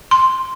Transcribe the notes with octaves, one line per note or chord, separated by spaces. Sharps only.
C6